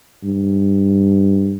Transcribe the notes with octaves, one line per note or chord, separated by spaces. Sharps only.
G2